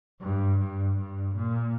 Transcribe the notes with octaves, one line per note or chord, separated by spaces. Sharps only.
G2
G2
G2
A#2